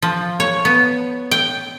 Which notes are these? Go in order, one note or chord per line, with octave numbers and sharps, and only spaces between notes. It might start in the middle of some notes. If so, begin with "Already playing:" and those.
F3
C#5
B3
G5